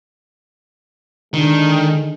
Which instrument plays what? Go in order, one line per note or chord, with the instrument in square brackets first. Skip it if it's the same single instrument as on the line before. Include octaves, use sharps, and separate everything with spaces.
[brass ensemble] D3 G#3 D4 [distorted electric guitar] D#3